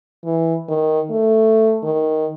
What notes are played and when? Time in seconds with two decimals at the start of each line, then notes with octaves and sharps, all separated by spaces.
0.25 E3
0.69 D#3
1.10 A3
1.84 D#3